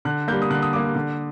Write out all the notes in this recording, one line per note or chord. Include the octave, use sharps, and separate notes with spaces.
D3 F#6
G3 A#3 G6
D#6
D3 F#6
D#6
G3 A#3 D6
D3